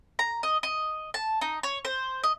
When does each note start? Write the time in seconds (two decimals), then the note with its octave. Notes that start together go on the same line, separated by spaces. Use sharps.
0.19 A#5
0.43 D#5
0.63 D#5
1.14 A5
1.41 D#4
1.63 C#5
1.85 C5
2.23 D#5